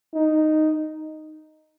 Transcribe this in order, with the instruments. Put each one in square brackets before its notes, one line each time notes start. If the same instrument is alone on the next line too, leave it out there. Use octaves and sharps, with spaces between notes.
[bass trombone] D#4